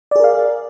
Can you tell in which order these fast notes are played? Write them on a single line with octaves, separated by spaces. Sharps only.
D5 G#4 A#4 F5